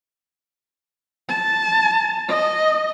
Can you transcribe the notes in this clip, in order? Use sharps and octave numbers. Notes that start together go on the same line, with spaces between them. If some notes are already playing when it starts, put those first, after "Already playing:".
A5
D#5